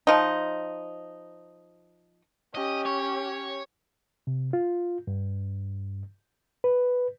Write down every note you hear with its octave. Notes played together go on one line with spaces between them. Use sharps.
F3 D#4
C#4 G4 D#5
C#5
C3
F4
G2
B4